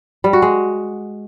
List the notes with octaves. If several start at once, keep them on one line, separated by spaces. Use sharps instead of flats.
G3
F#4
G#3